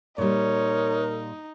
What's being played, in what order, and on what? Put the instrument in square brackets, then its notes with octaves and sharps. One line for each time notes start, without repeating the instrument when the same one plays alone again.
[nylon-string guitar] A#2 G3 [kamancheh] D#4 [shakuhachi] A#4 [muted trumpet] C#5